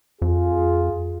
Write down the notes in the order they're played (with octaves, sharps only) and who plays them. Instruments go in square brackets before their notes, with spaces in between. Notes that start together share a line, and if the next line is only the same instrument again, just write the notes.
[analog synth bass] F2 [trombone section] F4 G#4